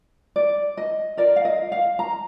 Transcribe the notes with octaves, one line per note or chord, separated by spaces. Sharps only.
D5
D#5
F4 A#4 D5
F5
D#5
F5
A#5